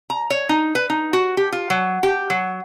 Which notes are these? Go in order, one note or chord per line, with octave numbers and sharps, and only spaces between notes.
A#5
C#5
D#4
B4
D#4
F#4
G4
F4
F#3
G4
F#3